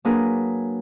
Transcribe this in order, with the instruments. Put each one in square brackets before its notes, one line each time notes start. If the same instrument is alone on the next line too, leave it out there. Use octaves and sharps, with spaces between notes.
[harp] F#3 A#3 D4 G#4 A#4 B4